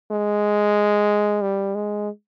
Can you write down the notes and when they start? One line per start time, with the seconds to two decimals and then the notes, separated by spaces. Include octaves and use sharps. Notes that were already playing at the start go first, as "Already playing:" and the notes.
0.11 G#3
1.42 G3
1.75 G#3